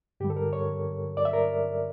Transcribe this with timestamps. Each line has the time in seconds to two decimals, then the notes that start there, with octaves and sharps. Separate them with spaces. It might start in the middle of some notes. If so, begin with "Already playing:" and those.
0.20 G2 D3 G3 G4
0.30 A4
0.37 A#4
0.53 C#5
1.17 D5
1.25 E5
1.33 A#4